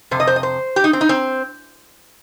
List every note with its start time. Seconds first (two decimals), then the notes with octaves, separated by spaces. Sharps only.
0.11 F2 C3 C5
0.20 D#5
0.27 C5
0.36 D#5
0.43 C5
0.76 G4
0.84 D#4
0.93 C4
1.01 D#4
1.09 C4